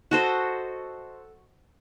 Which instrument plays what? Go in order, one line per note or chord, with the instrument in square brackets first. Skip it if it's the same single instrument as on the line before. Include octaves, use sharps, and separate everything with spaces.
[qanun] F#4 A4 C5 D#5